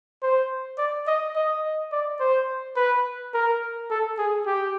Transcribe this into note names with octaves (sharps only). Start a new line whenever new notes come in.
C5
D5
D#5
D#5
D5
C5
B4
A#4
A4
G#4
G4